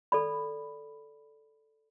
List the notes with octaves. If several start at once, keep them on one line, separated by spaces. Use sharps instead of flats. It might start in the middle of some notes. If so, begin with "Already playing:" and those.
A4 D5 B5